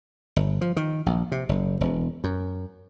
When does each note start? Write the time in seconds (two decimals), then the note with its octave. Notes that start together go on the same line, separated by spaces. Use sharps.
0.36 G1
0.61 F3
0.77 D#3
1.06 A#1
1.32 C3
1.49 F#1
1.81 E1
2.24 F#2